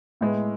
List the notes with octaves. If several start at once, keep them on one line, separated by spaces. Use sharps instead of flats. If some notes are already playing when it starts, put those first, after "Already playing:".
A2 G#3 B3